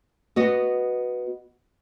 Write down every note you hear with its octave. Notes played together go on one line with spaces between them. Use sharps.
B3 F#4 D#5